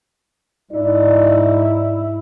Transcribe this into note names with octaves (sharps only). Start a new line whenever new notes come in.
G#2 D#4 E4 D5